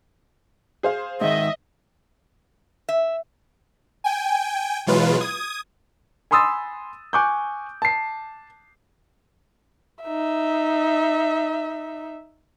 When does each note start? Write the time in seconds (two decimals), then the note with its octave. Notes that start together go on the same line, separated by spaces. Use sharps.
0.83 G#4 C5 F5
1.21 G#2 D#3 D#5 E5
2.89 E5
4.04 G5 G#5
4.87 B2 E3 F#3 G#3 F4 B4
5.20 D#6 G#6
6.31 G#5 B5 C6 D#6 E6 A6
7.13 G#5 C#6 D6 F#6 G6
7.82 A5 C7
10.04 D#4 E5